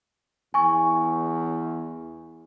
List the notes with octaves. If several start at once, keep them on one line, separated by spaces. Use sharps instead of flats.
E2 G#5 C#6